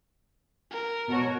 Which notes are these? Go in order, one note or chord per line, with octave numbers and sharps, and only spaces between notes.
A#4
B2 F#4 C#5